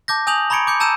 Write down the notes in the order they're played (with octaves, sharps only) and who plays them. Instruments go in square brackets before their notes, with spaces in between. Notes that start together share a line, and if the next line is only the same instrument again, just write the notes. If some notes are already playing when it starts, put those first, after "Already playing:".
[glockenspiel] A5 D6 G6 A#6
G#5 D#6 G6 F7 F#7
A#5 B5 C#6 G#6 C#7 D7
D6 G6 C#7
A5 A#5 E6 G6 D#7 E7